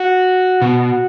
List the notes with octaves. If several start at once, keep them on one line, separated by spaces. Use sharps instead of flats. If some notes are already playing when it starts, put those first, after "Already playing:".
Already playing: F#4
B2